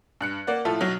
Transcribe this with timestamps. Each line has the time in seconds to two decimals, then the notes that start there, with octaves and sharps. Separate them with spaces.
0.21 G2 F#6 C#7
0.47 A#3 D5 F#5
0.65 A2 F3 F4 A4 E5
0.81 B1 F#3 F6